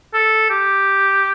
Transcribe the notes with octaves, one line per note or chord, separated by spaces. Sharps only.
A4
G4